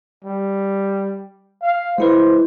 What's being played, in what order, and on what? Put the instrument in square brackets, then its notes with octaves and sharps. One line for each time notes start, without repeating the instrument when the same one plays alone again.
[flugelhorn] G3
F5
[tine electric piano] G#3 E4 B4 [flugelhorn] C5